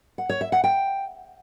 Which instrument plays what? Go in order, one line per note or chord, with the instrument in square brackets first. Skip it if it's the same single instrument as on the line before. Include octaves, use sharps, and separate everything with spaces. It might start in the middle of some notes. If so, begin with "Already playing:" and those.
[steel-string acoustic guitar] F#5
C#5
E5
F#5
G5